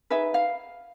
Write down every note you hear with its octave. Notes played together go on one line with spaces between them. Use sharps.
D#4 G#4 B4 E5
F5